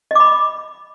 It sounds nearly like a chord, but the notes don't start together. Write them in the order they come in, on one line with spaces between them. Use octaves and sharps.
D#5 D6 B5